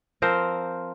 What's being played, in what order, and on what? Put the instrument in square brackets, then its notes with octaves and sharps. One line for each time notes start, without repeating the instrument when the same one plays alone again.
[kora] F3 C4 A#4 C5